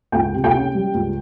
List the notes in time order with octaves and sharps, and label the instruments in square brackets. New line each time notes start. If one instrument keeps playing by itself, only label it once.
[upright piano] C#2 G5
C3
G5
C#4
G3
C#2